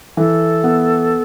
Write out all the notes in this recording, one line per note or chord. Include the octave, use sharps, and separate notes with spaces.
E3 A4
B3